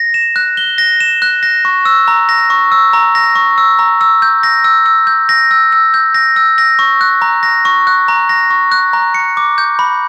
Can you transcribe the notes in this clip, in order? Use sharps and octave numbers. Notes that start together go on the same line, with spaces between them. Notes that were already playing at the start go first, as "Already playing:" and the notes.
Already playing: A#6
E7
F#6
G7
A#6
E7
F#6
A#6
C#6
E6
A#5
A#6
C#6
E6
A#5
A#6
C#6
E6
A#5
E6
G6
A#6
E6
E6
G6
A#6
E6
E6
G6
A#6
E6
A#6
C#6
F#6
A#5
A#6
C#6
F#6
A#5
A#6
C#6
F#6
A#5
C#7
D6
G6
B5